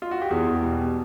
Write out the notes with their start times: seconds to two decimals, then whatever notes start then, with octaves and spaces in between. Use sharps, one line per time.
0.02 F4
0.11 F#4
0.22 G4
0.31 E2 G#4
0.63 B2 G3